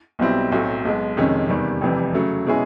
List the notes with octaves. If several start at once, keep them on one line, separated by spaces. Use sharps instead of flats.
B1 B2 G3 C4 E4
B1 A2 F#3 A3 C4
B1 B2 G#3
F2 C3 D#3 G#3 C#4
E2 C3 D#3 G3
F1 F2 C3 E3 G3
C#3 F#3 A3
B2 G#3 C#4 E4 G#4